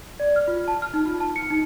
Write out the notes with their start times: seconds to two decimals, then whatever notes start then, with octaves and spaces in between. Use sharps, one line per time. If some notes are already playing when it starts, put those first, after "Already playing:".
0.20 D5
0.36 F6
0.48 F4
0.68 A5
0.82 F6
0.94 D#4
1.06 F4
1.20 A5
1.36 C#7
1.51 D#4